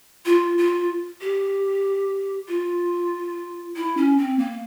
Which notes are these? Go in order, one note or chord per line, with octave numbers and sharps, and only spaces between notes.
F4
F4
G4
F4
E4
C#4
C4
A#3